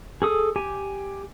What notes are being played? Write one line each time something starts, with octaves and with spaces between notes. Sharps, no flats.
G#4 A4 D#6
G4 G#5